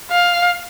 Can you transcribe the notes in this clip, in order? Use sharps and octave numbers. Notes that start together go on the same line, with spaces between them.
F5